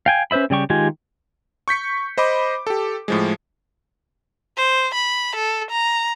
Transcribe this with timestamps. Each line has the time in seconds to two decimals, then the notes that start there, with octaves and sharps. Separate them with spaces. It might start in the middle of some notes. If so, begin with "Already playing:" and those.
0.06 F5 G5 G#5
0.31 C#4 B4 C5 E5 B5
0.50 C#3 G3 G4 C#6
0.70 D#3 G#3 F4 G4 G#5
1.68 C#6 G6 B6 C#7
2.18 C5 D#5 B5 D6
2.67 G4 A4
3.08 A2 F3 G#3
4.57 C5
4.94 B5
5.36 A4
5.71 A#5